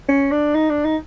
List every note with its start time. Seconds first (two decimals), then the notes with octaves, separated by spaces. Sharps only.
0.08 C#4
0.31 D4
0.54 D#4
0.70 D4
0.85 D#4